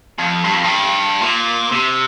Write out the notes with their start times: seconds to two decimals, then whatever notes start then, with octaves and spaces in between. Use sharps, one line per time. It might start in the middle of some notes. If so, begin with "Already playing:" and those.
0.18 F2
0.44 G2
0.53 F2
0.63 G2
1.21 A#2
1.72 C3